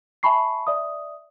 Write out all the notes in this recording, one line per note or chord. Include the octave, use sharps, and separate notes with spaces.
E5 G#5 A5 B5 C#6 C7
D5 E5 D#6